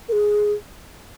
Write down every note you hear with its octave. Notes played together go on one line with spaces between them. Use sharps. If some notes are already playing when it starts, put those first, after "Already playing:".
A#4
G#4